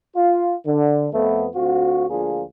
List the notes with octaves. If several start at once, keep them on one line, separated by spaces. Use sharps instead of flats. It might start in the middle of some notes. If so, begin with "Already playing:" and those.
F4
D3
F2 A3 B3
D2 C4 F4 F#4
D2 F3 A#3 D4 F4 G#4